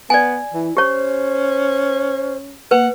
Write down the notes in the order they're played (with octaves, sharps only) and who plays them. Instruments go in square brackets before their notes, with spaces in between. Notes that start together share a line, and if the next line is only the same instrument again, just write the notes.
[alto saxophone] B3 [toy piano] D5 G#5
[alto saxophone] E3 [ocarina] E4
[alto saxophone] C#4 [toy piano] G4 C#5 [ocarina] C5
[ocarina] A#3 [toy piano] B4 [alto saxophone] F#5